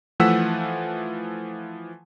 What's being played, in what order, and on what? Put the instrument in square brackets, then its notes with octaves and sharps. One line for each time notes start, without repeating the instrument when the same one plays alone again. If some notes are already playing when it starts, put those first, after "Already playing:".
[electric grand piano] E3 F3 A3 F#5 E6 B6